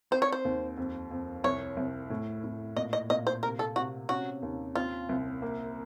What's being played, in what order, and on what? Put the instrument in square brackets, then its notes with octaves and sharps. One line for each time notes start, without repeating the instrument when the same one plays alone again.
[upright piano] C4 [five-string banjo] C5
[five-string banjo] C#5
C5
[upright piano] D#2
F2
F2
[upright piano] C2 [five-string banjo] C#5
[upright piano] C2
A2
A2
[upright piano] A#2 [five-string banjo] D#5
[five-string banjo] D#5
[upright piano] A#2 [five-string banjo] D#5
[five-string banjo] C5
[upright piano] C3 [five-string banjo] A#4
[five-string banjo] A4
[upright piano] C3 [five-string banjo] F#4
[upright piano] C#4 [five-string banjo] F#4
[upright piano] D#2
[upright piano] C4 [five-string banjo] F4
[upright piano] C2
A#3